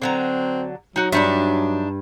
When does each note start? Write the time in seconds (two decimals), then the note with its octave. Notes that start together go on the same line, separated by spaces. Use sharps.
0.02 D3 F#3 C4 A#5
0.96 F#3 D#4 F#4
1.12 G2 D4 D#4 E5